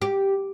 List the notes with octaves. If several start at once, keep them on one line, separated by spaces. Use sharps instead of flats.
G4